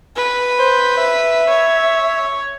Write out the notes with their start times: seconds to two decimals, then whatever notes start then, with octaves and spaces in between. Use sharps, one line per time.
0.17 B4
0.60 C5
0.97 E5
1.49 C#5